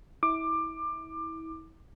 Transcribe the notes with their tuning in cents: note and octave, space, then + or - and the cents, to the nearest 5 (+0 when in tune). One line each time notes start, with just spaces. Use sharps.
E4 -30 D6 +20